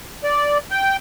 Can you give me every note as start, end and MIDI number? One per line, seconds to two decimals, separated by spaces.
0.24 0.58 74
0.71 0.97 79